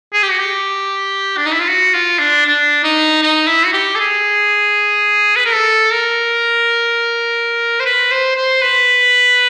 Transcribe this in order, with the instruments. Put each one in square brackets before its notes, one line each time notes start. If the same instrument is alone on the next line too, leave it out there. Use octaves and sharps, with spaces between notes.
[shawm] G#4
G4
F#4
G4
D4
D#4
E4
F4
F#4
F4
D4
D4
D#4
D#4
E4
F#4
G4
A4
G#4
B4
A#4
A4
A#4
C5
B4
C5
C5
B4